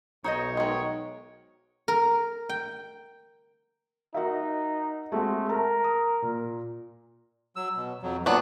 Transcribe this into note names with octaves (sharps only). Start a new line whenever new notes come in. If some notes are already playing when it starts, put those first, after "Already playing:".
B1 D#4 C5 C#5 D#5
D#3 G#3
A#4
G5
D#4 F#4 A#4 E5
G#3 A3 C4 F#4
A#4 A5 A#5
D#6
A#2
F#3 E6
B2
F2 F#3
A#2 F#3 B3 D4 F#6